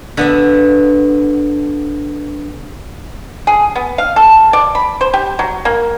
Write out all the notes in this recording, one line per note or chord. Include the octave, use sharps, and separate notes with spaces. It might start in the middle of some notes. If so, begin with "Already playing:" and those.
D3 B3 E5
G#4
B3
F5
A4
D5
B5
C5
G4
F#3
A#3